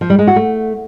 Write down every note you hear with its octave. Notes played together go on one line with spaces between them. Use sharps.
F3
G3
G#3
F#4
A3